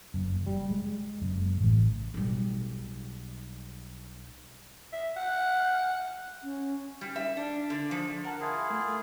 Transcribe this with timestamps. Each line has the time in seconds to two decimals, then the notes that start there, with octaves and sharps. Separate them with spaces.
0.14 F#1
0.46 G3
0.70 G#3
1.22 F#1
1.61 A1
2.14 B1 G3
4.93 E5
5.16 F#5
6.43 C#4
7.01 G3
7.16 E5
7.37 D4
7.70 D3
7.91 F3
8.24 A#4 F#5 A5
8.41 E4 F4 G#4
8.70 A3